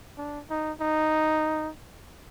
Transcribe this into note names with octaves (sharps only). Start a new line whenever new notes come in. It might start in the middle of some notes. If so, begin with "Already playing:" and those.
D4
D#4
D#4